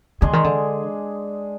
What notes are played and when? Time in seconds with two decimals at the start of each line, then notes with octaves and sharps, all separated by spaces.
0.21 D3 G#3 D4 G#4
0.33 D#3
0.44 D3